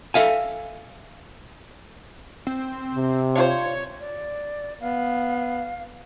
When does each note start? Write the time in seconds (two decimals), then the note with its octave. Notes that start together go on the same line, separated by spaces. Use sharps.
0.14 A4 E5 F5 G#5
2.47 C4
2.95 C3
3.35 D4 F4 C5 C#5
4.00 D5
4.81 B3 F5